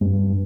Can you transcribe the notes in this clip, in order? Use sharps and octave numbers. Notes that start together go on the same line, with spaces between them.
G2